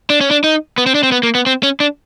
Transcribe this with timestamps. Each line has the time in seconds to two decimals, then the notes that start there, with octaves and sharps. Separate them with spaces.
0.10 D4
0.21 C#4
0.31 D4
0.44 D#4
0.78 B3
0.86 C4
0.95 D4
1.03 C4
1.12 B3
1.23 A#3
1.35 B3
1.46 C4
1.63 C#4
1.80 D4